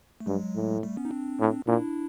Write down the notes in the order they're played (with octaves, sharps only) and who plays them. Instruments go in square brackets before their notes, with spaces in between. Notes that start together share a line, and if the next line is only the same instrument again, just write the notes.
[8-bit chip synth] A3
[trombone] G2 [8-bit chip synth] F#3 G#3
[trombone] A2
[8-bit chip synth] G3 A3
B3 C#4
D#4
C4 D4
[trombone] A2
[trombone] A#2 [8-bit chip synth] D4 E4